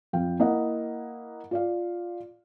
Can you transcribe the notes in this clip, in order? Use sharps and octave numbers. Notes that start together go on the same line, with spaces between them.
F2 F5 G5
A#3 E4 D#5 F#5
F4 D5 F5